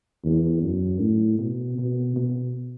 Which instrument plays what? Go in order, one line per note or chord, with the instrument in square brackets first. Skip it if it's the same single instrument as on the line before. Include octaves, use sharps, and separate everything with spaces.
[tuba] E2
F#2
A2
B2
B2
B2